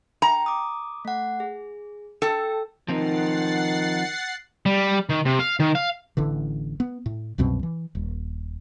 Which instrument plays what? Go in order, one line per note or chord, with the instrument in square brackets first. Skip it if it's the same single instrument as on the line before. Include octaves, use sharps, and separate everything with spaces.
[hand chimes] G5 [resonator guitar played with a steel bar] A#5
[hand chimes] D6 D#6
A3 F#5
G#4
[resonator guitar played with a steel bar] A4 [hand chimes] G5 E6
[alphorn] D#3 [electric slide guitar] F3 C4 D#4 [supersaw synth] F#5 A6 C7
[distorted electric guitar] G3
D#3
C3
F5
D#3
F5
[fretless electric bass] A1 D3 E3
B3
A2
C2 F#2 B2 C4
E3
D#1